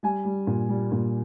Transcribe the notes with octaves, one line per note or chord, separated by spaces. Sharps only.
G3 G#5
G3
A#2
G3
A#2